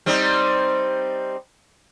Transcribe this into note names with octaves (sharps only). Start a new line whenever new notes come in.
G3 C4 D#4